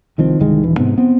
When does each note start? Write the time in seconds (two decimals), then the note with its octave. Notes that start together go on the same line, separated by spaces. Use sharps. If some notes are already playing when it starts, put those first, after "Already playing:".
0.18 C2 D#3 F3 C4
0.39 G1 C2 D#3 G#3
0.63 D#1 E3
0.77 G#2 C3 B3
0.98 B3 C4